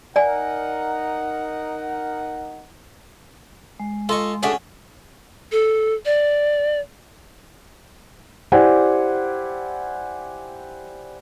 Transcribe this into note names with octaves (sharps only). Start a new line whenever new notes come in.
D#4 A#4 D5 F#5 G#5
G#3
F4 A4 D#5 C#6
A3 C#4 D4 F#4 G#4
A4
D5
E4 G4 C5 D5 F#5 G#5